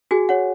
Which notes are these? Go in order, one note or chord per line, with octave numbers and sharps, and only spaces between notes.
F#4 G#4 G#5
C#5 F#5